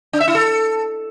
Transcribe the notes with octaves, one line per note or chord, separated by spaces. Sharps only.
D4
E5
E4
A4